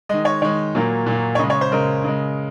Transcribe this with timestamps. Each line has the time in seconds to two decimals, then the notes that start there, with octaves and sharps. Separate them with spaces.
0.09 D#3 G#3 D#5
0.25 C#5
0.42 D#3 G#3 C#5
0.75 A#2 F#3 A#3
1.06 A#2 F#3 A#3
1.35 C#5
1.39 C#3 G#3 D#5
1.50 C#5
1.61 C5
1.72 C#3 G#3 A#4
2.04 C#3 G#3